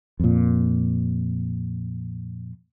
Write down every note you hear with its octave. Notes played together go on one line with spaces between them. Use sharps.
F2 A#2